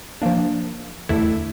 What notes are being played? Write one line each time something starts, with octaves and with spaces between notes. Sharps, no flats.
F3 A#3 D4
E2 D3 A3 E4